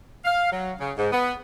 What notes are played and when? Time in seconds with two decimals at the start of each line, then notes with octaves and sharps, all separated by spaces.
0.25 F5
0.51 F#3
0.79 C#3
0.98 G#2
1.13 B3